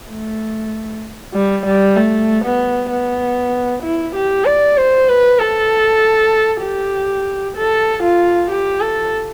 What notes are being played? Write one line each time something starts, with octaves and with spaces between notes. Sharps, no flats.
A3
G3
G3
A3
B3
B3
E4
G4
D5
C5
B4
A4
G4
A4
F4
G4
A4